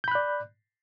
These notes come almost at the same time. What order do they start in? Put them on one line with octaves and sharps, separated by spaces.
G6 B5 F#6 D5